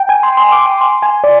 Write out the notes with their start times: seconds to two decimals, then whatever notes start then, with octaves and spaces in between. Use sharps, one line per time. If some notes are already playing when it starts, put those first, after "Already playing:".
Already playing: G5
0.09 G#5
0.23 C6
0.37 C6
0.52 D6
0.66 C6
0.81 C6
1.02 G#5
1.24 D5